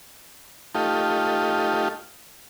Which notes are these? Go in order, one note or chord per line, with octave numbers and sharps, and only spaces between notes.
A3 D#4 F4 G4